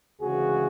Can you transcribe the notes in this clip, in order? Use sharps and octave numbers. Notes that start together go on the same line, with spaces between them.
D2 C#3 E3 G#3 F#4 G#4